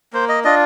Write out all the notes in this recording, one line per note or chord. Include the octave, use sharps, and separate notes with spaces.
A#3 C5
D#5
D4 F4 D#5